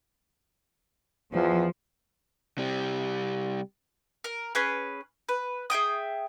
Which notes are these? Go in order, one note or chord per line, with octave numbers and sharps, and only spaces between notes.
E2 F3
C3 G3
A#4
C#4 G#4 B4
B4
G#4 E5 G5 D#6